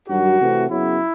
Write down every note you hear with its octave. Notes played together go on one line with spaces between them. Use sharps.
G2 D#3 F#3 F#4
C3 E3 A3 C4
F#2 C#3 F#3 B3 E4